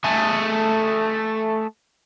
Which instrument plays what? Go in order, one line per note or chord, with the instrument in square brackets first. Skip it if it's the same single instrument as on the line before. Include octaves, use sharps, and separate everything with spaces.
[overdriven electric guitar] A3 G#4